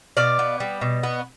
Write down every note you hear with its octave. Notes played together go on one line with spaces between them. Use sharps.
B2 D5 F5
B3
G3
B2
B3